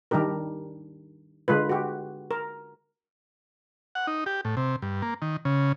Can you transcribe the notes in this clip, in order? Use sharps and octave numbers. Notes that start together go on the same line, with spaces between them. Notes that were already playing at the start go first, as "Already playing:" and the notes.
D#3 G3 D4 G4 A#4
D3 G#3 F4 B4
F#4 G4
A#4
F#5
D#4
G4
A2
C3
G2
A#3
D#3
C#3